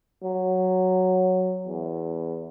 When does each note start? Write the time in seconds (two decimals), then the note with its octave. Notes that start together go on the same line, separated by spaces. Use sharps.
0.23 F#3
1.67 E2